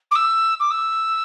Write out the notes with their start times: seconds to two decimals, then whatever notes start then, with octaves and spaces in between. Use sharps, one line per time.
0.11 D6
0.15 E6
0.60 D6
0.70 E6